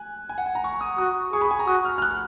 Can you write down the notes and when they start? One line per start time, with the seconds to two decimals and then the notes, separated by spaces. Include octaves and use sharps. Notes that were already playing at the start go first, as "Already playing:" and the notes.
Already playing: G#5 F#6
0.29 G#5
0.38 F#5
0.46 G#5
0.55 A#5
0.64 C#6
0.81 D#6
0.98 F#4 D#6
1.33 G#4 C#6
1.41 B5
1.51 G#5
1.59 A#5
1.67 F#4 D#6
1.85 F6
1.98 F6
2.02 F#6
2.11 F6